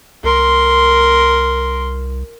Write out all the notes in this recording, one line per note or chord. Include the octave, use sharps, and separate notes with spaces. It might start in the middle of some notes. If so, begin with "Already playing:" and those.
C2 A#4 C6